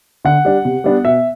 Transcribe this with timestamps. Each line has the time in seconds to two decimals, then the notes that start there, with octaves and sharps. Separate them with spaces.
0.25 D3 F#5
0.45 G3 D4
0.65 C3
0.84 G3 B3 D4
1.05 B2 E5